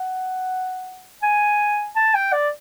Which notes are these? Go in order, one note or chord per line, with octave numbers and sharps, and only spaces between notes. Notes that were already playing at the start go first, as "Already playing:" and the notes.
Already playing: F#5
G#5
A5
G5
D5